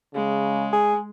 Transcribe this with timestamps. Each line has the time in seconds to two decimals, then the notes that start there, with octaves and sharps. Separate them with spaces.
0.15 C#3 G#3
0.72 G#4